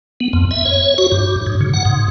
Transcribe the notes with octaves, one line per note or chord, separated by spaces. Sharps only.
B3
F2
E5
C#5
F#4
G2
G#2
C#3
F#5
G#2